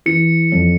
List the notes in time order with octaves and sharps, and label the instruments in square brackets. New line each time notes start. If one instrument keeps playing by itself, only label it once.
[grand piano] E3 [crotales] C#7
[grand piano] F2